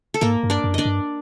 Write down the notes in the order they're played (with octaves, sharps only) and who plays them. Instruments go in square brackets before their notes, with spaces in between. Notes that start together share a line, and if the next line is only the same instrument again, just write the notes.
[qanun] A4
[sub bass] G#2 [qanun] A#3 A#4
[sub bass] G2
[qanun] D4 D5
[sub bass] F#2
[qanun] D4 D5 D#5
[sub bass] G2